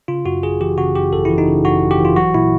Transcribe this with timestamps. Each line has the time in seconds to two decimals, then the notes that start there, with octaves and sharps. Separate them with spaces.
0.08 C#3 F4
0.25 F#2 F#4
0.43 G#1 G#4
0.61 E3 G4
0.77 C#3 F#4
0.95 F#2 G4
1.13 G#1 A4
1.25 E3 E4
1.38 D#4
1.48 C#3
1.65 F#2 F#4
1.82 G#1
1.91 G4
1.99 E3
2.05 F4
2.17 F#3 F#4
2.34 A#2 E4